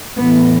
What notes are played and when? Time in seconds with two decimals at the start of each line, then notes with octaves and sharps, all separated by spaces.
0.17 A2 E3 B3